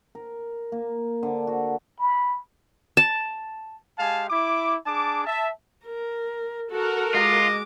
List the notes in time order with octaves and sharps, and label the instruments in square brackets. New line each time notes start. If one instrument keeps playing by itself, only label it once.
[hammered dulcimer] A#4
A#3
D3
F#4
[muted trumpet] B5
[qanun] A5
[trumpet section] G#3 G4 F5 G#5 A5
E4 D6
D4 G#4 A5 D6
E5 A5
[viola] A#4
[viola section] F#4 A#4 [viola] A4
[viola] G#3 D6 [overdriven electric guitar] F4 [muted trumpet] D#5